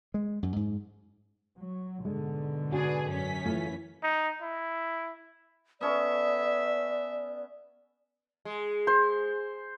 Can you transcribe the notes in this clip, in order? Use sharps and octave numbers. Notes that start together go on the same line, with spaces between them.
G#3
F#2
G#2
F#3
G#2 B2 D3 G#3
D4 F#4 G#4 B4
F#2 C#4 B6
E3 A3 F4 A4
D#4
E4
B3 C#4 A4 D5 E5
G#3
C5